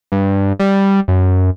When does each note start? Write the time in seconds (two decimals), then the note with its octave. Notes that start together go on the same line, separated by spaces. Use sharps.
0.12 G2
0.59 G3
1.08 F#2